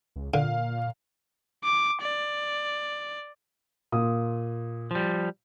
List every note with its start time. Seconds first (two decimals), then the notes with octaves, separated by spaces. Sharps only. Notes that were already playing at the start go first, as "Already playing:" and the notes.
0.16 C#2
0.34 A#2 D3 F5
1.65 D6
2.02 D5
3.92 A#2 F4 D#6
4.91 F3 G3